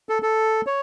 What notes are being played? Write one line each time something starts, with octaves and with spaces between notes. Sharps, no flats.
A4
A4
C#5